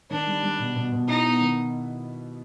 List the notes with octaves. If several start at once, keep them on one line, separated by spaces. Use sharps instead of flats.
D#3 D4
G3
G3
B2
B2
B2
D#4 E4
B3
D#3